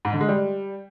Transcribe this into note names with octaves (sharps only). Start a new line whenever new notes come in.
G#2
D3
G#3
G3